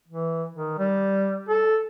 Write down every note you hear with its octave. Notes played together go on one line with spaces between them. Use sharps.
E3
D#3
G3
A4